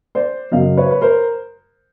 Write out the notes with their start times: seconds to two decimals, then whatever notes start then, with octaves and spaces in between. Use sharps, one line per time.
0.15 C5 D5
0.52 F#2 C#3 F#3 D#5 F5
0.77 B4 C#5
0.91 B4
1.01 A#4 C5